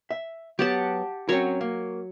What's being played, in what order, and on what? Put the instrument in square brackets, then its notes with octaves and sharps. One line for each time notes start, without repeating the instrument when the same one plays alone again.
[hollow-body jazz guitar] E5
[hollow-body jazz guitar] F#3 B3 [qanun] G4 F#5 A5
[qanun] F#3 C#5 [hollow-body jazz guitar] C4 C#4 A#4
[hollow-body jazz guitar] A#3